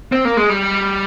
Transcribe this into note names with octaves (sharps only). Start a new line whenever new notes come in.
C4
A#3
G#3
G3